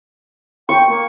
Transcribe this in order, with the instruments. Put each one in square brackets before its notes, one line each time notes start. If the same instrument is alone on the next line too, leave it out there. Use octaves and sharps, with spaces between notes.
[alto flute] G5 [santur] C#6
[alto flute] A#3